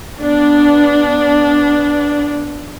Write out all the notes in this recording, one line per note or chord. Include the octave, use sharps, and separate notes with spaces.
B3 D4